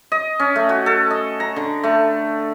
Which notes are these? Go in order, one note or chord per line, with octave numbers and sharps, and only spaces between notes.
D#5
C#4
A3
F#4
A4
D#5
A#5
D3
A3